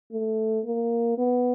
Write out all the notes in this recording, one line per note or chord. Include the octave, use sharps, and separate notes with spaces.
A3
A#3
B3